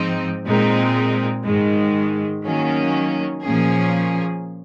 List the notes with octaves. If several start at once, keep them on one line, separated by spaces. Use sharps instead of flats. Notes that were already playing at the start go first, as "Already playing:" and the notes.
Already playing: G#2 F3 C4 D#4
A#2 G#3 C4 D#4 A#4
G#2 D#3 G#3
D#3 F#3 A#3 C#4
A#2 F3 A#3 C#4 G#4